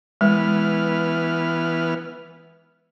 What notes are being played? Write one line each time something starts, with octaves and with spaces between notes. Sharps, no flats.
E3 G#3 B3 F6